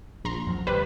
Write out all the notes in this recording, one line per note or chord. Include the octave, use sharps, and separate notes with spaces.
A#1 A#5 C6
F#2 F3 F#3
A1 D2 G3 B4 C5